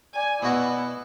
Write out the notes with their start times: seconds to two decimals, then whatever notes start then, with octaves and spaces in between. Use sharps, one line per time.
0.14 D5 G#5
0.42 B2 B3 E4 F#4